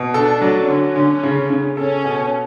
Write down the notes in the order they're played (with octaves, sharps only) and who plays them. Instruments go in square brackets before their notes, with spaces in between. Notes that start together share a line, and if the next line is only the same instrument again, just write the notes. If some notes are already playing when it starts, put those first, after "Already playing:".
Already playing: [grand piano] B2
[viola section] D4 [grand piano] A4
[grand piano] F#3
[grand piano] D3 [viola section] C#4
[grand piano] D3
C#3
C#3
[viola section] C#4 [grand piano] A4
[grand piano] B2